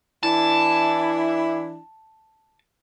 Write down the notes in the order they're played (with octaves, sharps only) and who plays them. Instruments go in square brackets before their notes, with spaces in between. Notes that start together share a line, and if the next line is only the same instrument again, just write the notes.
[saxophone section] E3 D4 E4 [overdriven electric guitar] A5